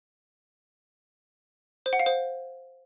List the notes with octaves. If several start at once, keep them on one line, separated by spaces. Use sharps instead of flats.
C5
F#5
F5
C5